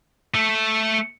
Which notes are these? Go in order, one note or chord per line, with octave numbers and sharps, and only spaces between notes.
A3 A4